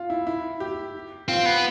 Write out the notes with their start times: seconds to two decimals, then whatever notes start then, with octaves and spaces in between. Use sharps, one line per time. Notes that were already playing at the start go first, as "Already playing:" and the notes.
Already playing: F4
0.10 E4
0.27 E4
0.60 G4
1.28 C4 F4
1.46 B3